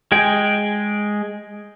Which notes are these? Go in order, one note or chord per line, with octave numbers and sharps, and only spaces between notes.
G#3 G#4 G5